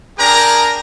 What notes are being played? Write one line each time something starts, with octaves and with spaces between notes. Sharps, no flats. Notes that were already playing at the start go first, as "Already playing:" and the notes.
D4 G#4 A#4 G5 A#5